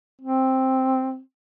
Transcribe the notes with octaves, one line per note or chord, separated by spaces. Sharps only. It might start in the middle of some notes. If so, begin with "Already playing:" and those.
C4